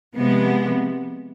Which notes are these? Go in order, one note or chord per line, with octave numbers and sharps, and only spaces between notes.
C3 F3 G#3 B3